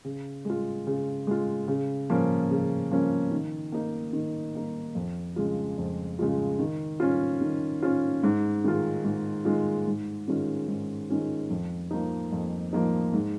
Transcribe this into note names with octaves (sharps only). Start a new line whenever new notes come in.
C#3
G#3 F4
C#3
G#3 F4
C#3
F3 A#3 C#4
C#3
F3 A#3 C#4
D#3
A#3 D#4
D#3
A#3 D#4
F2
C#3 G#3 F4
F2
C#3 G#3 F4
D#3
C#4 F4
D#3
C#4 F4
G#2
D#3 G#3 F4
G#2
D#3 G#3 F4
G#2
D#3 G#3 C#4 F4
G#2
D#3 G#3 C#4 F4
F2
F3 A#3 D#4
F2
F3 A#3 D#4
G#2